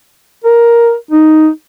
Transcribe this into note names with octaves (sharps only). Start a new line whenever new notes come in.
A#4
D#4